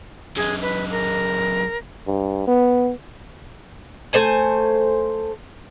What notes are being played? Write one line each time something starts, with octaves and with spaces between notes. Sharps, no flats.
F#2 G#3 G#4
B4
A#4
G2
B3
A3 C5 G#5